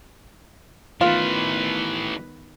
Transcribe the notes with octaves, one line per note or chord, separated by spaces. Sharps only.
D#3 E3 A3 B3 F4 B4